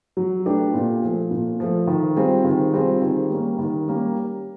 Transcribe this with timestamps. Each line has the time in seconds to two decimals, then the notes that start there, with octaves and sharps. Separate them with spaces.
0.17 F#3
0.46 A3 D4 G4 B4
0.74 A#2
1.03 F3 A3
1.31 A#2
1.60 F3 A3
1.87 D#3
2.16 G3 C4 F4 G#4
2.44 D#3
2.73 G3 C4 F4 G#4
3.02 D#3
3.30 G3 A#3 C#4
3.59 D#3
3.88 G3 A#3 C#4